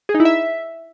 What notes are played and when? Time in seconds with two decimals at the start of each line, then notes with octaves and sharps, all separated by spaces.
0.09 G#4
0.15 D#4
0.20 E4
0.25 E5